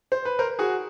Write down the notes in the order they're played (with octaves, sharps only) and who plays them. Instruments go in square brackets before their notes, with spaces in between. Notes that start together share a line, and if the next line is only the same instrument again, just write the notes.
[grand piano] C5
B4
A#4 C5
F#4 G#4